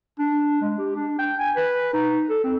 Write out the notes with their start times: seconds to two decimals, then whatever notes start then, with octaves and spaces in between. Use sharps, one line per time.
0.19 D4
0.61 G#3
0.78 G4
0.96 D4
1.19 G5
1.39 G#5
1.56 B4
1.94 D#4
2.29 A4
2.44 C4